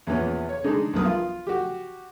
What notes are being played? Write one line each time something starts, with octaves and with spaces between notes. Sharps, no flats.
E2 A#2 B3 C#4
C#5
G#3 D4 D#4 G#4
B1 G2 B3 A#4 B4 D#6
F4
F#4 G4